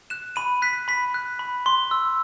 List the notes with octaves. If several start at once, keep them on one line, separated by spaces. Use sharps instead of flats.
F#6 E7
B5 D#7
F#6 B6
B5 B6
F#6
B5
C6
E6